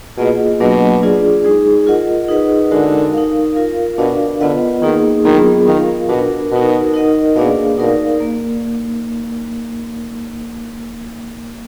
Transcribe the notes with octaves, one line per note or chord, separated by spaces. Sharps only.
B2 A#3 F4 G#4 D#5
B2 F#3 A#3 D4
D4 F4 G#4 D5
G#3 D#4 G#4
F4 A#4 D#5 F#5
D#4 G#4 B4 D#5 F#5
D3 G#3 D#4 F#4 A#4
D#4 A#4 F5
F4 A#4 F5
B2 D4 F#4 A#4 D5 F5
D3 B3 F4 B4 D#5 F#5
D#3 A#3 D#4 G#4
D#3 F#3 B3 D4 F4 G#4
D#3 F4 A#4 F5
B2 D4 F#4 A#4
B2 D#4 F#4 A#4
D#4 A#4 D#5 F#5
B2 A#3 D4 G#4 D5 F5
B2 D#4 A#4 D5 F5
A#3